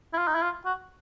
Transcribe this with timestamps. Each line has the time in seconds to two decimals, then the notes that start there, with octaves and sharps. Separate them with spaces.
0.13 E4
0.18 F4
0.27 D#4
0.35 E4
0.42 F4
0.65 F#4